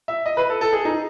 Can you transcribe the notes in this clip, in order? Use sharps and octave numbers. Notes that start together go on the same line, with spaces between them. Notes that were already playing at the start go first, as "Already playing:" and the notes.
E5
D#5
B4
A4
A4
G#4
D#4